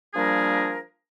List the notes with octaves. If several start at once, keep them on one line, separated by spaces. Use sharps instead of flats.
F3 G3 A#3 D4 G#4 A#4